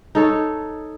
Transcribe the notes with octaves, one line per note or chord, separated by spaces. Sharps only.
D#4 A4 C#5